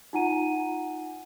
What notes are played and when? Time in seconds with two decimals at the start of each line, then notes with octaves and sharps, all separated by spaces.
0.13 D#4 F4 F#5 G#5 A#5 D#7